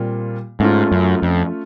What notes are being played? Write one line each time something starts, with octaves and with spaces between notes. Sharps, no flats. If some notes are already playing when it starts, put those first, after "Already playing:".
Already playing: A#2 G3 C4 F4
G#2 A3 C#4 F4
F#2
F2